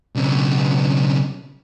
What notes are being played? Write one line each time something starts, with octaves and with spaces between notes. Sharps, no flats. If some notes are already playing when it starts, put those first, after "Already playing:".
B1 C#3